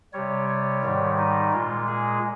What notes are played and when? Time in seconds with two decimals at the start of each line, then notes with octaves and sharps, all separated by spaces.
0.13 C3 G3 C#5
0.49 C#5
0.83 G#2 D#3 G3
1.18 D#4
1.53 A#2 G#3 F4
1.87 G#4